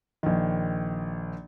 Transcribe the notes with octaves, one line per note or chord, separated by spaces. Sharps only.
A#1 D#3